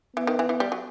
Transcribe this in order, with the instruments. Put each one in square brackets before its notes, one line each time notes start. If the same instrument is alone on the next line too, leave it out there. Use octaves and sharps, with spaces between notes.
[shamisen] E3 [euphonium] B3
[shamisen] D#3
E3
E3
G3
F#3